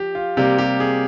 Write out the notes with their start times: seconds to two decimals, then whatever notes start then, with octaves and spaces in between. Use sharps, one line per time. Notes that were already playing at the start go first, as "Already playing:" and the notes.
Already playing: F3 G4
0.15 F4
0.37 C3 G3 A#3 G4
0.58 G4
0.80 G#4